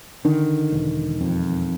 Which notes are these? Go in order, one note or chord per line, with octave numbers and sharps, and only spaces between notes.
D3 D#3
E1
F2